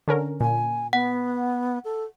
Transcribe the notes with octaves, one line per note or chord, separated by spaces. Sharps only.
D3 C#4 A#4
A#2 G#5
B3 F#5
A4